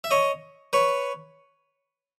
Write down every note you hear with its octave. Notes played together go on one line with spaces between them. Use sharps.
E5
C#5 D#5
B4 C#5